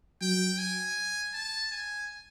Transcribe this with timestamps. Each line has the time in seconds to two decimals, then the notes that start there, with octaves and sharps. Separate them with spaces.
0.21 F#3 G5
0.58 G#5
1.34 A5
1.71 G#5